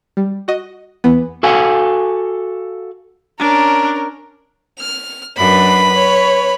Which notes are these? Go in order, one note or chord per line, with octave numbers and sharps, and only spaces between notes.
G3
F#4 D#5
E2 E3 B3
F#4 A4 F5 G#5
C#4 D4 A#4
F6
F#2 D4 B4 B5
C#5